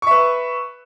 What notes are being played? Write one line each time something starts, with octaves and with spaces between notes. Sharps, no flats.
B4 E5 C#6